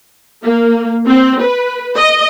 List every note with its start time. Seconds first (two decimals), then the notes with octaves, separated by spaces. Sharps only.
0.43 A#3
1.07 C4
1.43 B4
1.96 D#5